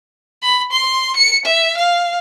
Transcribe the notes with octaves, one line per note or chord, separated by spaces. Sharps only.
B5
C6
C#7
E5
F5